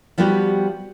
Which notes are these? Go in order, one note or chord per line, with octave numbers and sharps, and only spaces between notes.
F3 G3 B3 F#4 G4